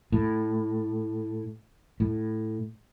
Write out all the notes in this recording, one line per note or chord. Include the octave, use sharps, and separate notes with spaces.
A2
A2